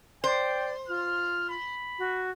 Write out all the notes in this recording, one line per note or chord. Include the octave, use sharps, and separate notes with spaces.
C5 D5 G5
F4 F6
B5
F#4